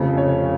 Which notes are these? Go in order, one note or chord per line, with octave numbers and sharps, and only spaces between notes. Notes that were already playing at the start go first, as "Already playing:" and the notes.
Already playing: F1 F2 C#3 F3
C#5